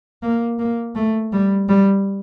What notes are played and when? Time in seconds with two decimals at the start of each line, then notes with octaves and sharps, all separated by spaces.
0.23 A#3
0.59 A#3
0.95 A3
1.33 G3
1.69 G3